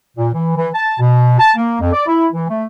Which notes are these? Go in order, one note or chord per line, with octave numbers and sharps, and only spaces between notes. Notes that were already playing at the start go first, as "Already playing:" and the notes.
A#2
E3
E3
A5
B2
A5
A#3
F2
D5
E4
E3
A3